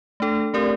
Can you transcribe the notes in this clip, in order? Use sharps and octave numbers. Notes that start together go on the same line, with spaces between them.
A3 D4 A4
A3 C4 G4 A#4 D5